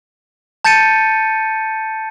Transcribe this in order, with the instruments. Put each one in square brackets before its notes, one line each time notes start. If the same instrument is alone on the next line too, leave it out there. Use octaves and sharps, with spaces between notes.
[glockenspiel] A5 G6 A6 C#7 D#7